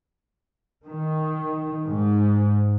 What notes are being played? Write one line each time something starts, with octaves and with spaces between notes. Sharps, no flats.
D#3
G#2